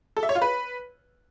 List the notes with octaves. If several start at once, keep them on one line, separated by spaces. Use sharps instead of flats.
A4
E5
C#5
F4
B4